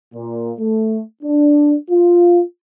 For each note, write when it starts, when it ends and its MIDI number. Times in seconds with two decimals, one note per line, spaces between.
0.14 0.52 46
0.59 1.00 57
1.23 1.75 62
1.90 2.42 65